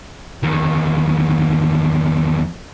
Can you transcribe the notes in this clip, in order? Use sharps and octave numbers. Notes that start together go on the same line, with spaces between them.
E2 D#3